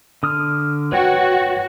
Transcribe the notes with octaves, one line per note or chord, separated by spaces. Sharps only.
D3 D#6 F6
F#4 B4 C#5 G5